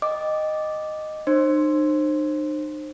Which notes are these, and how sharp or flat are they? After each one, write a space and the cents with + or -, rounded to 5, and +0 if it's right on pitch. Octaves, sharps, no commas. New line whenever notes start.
D#5 -10 G5 +0 D6 +0
D#4 -45 C5 +25 C6 +0